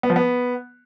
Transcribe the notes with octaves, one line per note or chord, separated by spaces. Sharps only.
B3
F3
B3